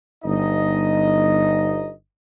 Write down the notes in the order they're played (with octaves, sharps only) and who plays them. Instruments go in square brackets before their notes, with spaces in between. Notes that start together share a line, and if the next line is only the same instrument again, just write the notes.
[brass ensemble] G1 D#4 D#5